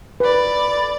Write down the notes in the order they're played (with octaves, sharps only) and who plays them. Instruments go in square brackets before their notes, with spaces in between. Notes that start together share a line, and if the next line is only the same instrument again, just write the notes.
[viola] A4 D5 [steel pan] B4 [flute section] B5